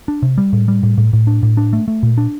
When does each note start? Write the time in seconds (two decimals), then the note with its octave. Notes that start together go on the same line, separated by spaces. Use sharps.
0.08 D4
0.22 C3
0.38 G3
0.53 A2
0.68 G3
0.83 A2
0.98 A2
1.13 A2
1.27 D4
1.43 A2
1.57 D4
1.73 A3
1.88 A3
2.03 A#2
2.18 D4